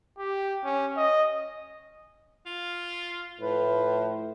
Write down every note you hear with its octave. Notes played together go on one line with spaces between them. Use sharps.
G4
C#4
D#5
F4
A2 F3 B4